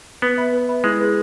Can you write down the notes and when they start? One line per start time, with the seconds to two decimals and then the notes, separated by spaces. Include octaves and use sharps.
0.22 B3 B4
0.37 E5 B5
0.53 B4
0.69 E5 B5
0.84 G#3 E4
1.00 G#4 B4